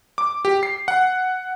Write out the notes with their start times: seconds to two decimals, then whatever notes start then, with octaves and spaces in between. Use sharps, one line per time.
0.18 D6
0.45 G4
0.63 C7
0.88 F#5